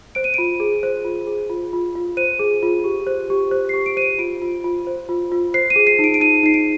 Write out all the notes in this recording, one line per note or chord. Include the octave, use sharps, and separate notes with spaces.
C5 D7
D#7
F4 D7
G#4
C5
F4
G#4
F4
F4
F4
C5 D#7
G#4
F4
G4
C5
G4
C5
G4 C7
D7
C5 D#7
D7
F4 D7
F4
F4
C5
F4
F4
C5 C7
D#7
G#4
C7
D#4
D7
D7
D#4 D#7
D#4 C7
D7